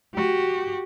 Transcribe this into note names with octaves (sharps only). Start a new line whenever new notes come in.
F#4 G4